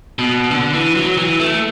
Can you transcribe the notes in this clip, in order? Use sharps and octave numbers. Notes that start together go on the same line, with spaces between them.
B2
D3
E3
F#3
E3
A3